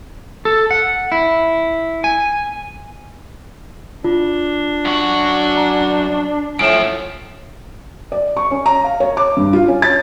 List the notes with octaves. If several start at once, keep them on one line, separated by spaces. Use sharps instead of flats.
A4
F#5
E4
G#5
D4 F4
F#2 F#4
A#5
F#2 A2 F3 D7 E7
D5
C#6
C#4
A#5
F5
C#5
D6
G2
F4
C#4
A6